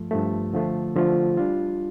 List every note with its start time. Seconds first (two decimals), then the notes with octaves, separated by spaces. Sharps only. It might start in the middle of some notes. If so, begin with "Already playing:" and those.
Already playing: G2 F3 A3
0.11 G2 F3 A3
0.53 D3 F3 A3 F4
0.95 D3 F3 A3 F4
1.37 G3 D4 F4